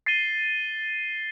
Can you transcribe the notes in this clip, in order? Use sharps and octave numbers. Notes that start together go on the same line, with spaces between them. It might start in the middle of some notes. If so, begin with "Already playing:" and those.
A6 C7 D#7 G7